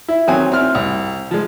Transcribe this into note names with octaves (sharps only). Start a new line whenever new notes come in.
E4
D#3 F#3 C4 G#5
C4 E4 F6
C2
F3 G#3